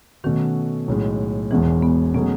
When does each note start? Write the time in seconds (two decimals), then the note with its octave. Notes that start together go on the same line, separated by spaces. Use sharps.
0.24 B2 D#3 A3 C#4 F#4
0.88 B1 A2 G#3
1.51 E1 E2 B2 E3 G#3
1.82 B3
2.14 B2 F#3 A3 B3 C#4 G#4